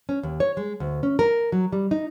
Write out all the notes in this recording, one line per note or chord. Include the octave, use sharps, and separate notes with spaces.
C#4
D#2
C#5
G#3
D2
C#4
A#4
F#3
G3
D#4